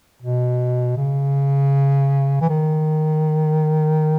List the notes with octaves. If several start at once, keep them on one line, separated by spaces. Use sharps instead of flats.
B2
C#3
E3
D#3